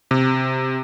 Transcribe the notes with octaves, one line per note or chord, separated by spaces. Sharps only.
C3